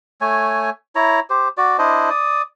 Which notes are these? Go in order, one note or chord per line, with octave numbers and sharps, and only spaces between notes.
A3 C#5 G#5
E4 C#5 A#5
G4 C5
F#4 D5
D4 E4 C5 D#5
D5 D#6